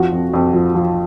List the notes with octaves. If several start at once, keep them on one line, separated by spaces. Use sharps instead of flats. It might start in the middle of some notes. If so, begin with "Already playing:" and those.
Already playing: F2 F3 F#4
F2
F2
F3
F3